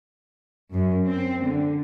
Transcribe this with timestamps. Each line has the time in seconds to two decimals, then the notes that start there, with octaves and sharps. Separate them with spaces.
0.73 F#2
1.07 C4
1.44 D3